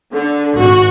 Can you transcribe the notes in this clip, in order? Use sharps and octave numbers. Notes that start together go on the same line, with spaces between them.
D3
G#1 F#4